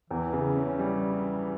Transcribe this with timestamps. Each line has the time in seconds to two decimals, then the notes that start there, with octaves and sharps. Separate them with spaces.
0.10 E2 E3
0.33 C#3
0.57 C#4
0.79 G3